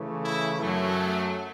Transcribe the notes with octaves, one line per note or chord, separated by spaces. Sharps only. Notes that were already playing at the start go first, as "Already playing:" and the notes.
Already playing: C#3 E3 A3
E4
F#2 F#3 A3